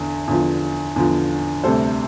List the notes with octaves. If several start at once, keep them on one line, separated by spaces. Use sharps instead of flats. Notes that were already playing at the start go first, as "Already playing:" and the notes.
Already playing: E2 D3
E2 D3 F3
E2 D3 F3
D2 C3 G3 A4 C5